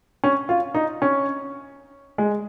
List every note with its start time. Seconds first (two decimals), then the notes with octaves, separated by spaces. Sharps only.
0.24 C#4
0.49 F4
0.75 D#4
1.02 C#4
2.18 G#3